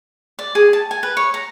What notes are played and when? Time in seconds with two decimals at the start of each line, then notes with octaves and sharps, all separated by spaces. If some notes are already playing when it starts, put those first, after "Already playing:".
0.39 D5
0.55 G#4
0.73 A5
0.91 G#5
1.03 B4
1.17 C#5
1.34 A#5